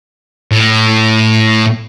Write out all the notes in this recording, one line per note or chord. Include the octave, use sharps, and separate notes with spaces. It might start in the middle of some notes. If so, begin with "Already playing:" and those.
A2